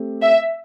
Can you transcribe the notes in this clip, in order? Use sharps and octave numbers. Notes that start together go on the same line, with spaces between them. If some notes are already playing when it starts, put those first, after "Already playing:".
Already playing: A3 C4 G4
E5